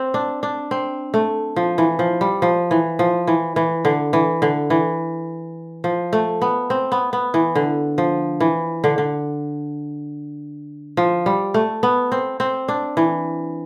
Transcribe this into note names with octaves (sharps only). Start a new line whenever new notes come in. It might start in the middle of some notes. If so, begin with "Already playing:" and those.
Already playing: C4
D4
D4
C4
A3
F3
E3
F3
G3
F3
E3
F3
E3
E3
D3
E3
D3
E3
F3
A3
B3
C4
B3
B3
E3
D3
F3
E3
D3
D3
F3
G3
A3
B3
C4
C4
D4
E3